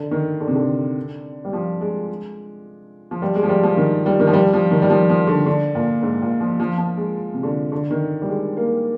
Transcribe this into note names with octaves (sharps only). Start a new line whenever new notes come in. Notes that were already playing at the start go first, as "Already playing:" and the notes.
Already playing: D3
D#3
D3
C3
D3
G3
F3
G#3
F3
G3
G#3
F3
G3
F3
D#3
G3
D#3
F3
G3
F3
D#3
G3
F3
F3
D3
D3
A#2
G#2
A#2
F3
F3
F3
G#3
C3
D3
D3
D#3
G3
G#3
A#3